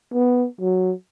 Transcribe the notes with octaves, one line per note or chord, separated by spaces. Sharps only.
B3
F#3